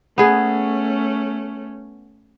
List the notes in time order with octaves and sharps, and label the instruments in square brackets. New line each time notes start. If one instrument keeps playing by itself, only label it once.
[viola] A3 C#4 [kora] B3 G#4